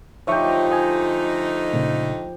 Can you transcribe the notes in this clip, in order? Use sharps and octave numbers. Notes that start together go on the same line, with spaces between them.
D3 F3 A3 D#4 G4 C#5 E5 C#6
D#5 G#5
A#2 C#3